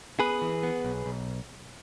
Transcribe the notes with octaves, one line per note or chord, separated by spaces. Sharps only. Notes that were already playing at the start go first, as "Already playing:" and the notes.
B3 G#4 B4
E3
B3
B1
B1